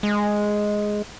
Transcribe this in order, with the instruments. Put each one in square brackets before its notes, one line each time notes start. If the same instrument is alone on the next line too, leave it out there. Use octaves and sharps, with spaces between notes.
[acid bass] G#3